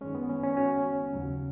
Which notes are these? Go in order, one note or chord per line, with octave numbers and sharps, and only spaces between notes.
F#2 D#3 G#3 C#4
B3
C#4
C#4
C#4 F#4
D#2 C#3 F#3